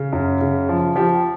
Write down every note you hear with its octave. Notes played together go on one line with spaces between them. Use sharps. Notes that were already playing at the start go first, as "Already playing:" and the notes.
Already playing: C#3
F#2
C#3
F3
F3 G4